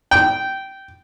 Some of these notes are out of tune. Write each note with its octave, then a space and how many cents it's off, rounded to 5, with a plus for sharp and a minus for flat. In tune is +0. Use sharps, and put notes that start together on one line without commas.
G5 -15